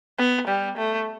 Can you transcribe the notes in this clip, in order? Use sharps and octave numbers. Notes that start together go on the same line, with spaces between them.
B3
G3
A3